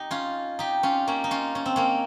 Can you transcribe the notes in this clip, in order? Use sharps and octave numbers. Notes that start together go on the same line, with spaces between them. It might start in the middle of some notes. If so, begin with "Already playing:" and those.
Already playing: D#4 G4
C#4 F4
D#4 G4
C#4 F4
A#3 C#4
D#4
C#4 F4
C#4
C4
A#3 C#4